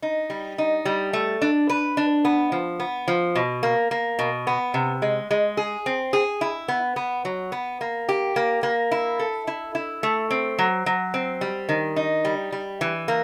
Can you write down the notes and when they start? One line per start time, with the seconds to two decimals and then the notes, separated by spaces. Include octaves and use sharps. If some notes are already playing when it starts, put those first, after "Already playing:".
0.02 D#4
0.30 G3
0.58 D#4
0.85 G3
1.13 A3
1.41 D4
1.69 B4
1.97 D4
2.25 B3
2.52 F3
2.80 B3
3.08 F3
3.35 B2
3.63 A#3
3.91 A#3
4.19 B2
4.47 B3
4.74 C3
5.02 G#3
5.31 G#3
5.57 G#4
5.86 C4
6.13 G#4
6.41 E4
6.68 B3
6.96 B3
7.25 F#3
7.52 B3
7.81 A#3
8.09 G4
8.36 A#3
8.63 A#3
8.91 E4
9.19 A4
9.47 E4
9.75 E4
10.03 A3
10.31 C4
10.59 F#3
10.86 F#3
11.14 C4
11.41 G3
11.69 D#3
11.96 D#4
12.25 G3
12.52 G3
12.81 E3
13.08 A#3